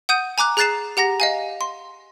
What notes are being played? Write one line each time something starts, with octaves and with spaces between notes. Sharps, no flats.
F#5 D#6 G6 D#7
G#5 A#5 D6 F#6
G#4 A#5 F#6 A6 C7 E7
G4 F#5 A#5 A#6
D#5 F5 G#5
C6